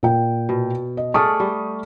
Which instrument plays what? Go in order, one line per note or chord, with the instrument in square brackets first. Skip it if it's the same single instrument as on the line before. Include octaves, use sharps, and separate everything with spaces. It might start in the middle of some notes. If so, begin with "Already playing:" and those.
[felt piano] A#2 G5
[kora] B2
[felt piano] D#5
[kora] A3 G#4 D5 [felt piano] C#6 D#6 F6
[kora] G3